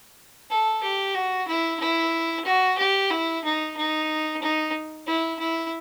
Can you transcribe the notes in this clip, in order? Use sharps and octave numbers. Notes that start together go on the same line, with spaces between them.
A4
G4
F#4
E4
E4
F#4
G4
E4
D#4
D#4
D#4
E4
E4